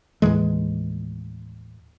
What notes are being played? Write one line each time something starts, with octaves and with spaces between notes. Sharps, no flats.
D#2 A2 E3 G#3